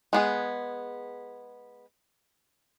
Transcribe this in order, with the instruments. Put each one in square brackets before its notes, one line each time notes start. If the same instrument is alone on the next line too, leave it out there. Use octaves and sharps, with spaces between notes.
[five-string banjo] G#3 B3 G#4